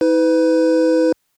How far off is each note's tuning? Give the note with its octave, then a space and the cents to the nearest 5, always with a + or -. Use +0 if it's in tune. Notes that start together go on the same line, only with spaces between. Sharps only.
E4 -45 B4 +25